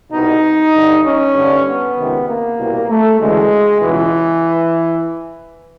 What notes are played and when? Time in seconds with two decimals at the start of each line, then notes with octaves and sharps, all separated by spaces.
0.12 C2 B2 D#4
0.74 G2 D3
1.04 C#4
1.35 G2 D3
1.66 B3
1.96 C#2 C3 D#3
2.27 A#3
2.58 C2 B2
2.89 A3
3.20 D2 C#3 E3 G#3
3.81 C#2 B2 E3